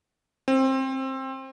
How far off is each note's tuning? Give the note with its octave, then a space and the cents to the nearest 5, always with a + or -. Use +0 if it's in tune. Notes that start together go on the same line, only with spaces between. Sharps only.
C4 +20